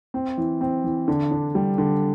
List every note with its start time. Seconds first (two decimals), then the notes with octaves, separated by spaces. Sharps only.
0.14 C4
0.38 E3
0.61 C4
0.84 E3
1.08 D3
1.31 D4
1.55 G3
1.78 D3